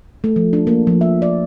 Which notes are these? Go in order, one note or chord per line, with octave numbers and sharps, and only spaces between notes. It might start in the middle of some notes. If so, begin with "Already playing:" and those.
A3
F3
D4
A#3
F3
E5
D5